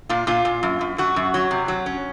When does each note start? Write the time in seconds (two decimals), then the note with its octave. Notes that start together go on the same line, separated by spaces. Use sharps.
0.09 A#2 F4
0.27 A#2 F4
0.45 A#2
0.63 F#2
0.81 F#2
0.98 F#2 F#4
1.16 F#2
1.34 F#3
1.51 C3
1.68 F#3
1.86 C#4